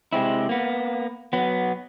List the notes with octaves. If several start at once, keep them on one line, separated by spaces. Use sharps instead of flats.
C3 G#3 C4 E4
A#3 B3
F#3 B3